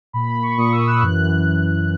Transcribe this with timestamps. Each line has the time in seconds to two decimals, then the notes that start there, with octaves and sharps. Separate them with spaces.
0.13 A#2 B5
0.28 B5
0.43 C#6
0.58 A#2 D#6
0.72 E6
0.87 F#6
1.02 F#2 E3 F#6